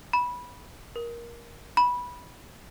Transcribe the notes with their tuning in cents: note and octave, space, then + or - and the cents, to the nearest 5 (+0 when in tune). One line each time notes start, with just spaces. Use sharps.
B5 -10
A#4 +15
B5 -10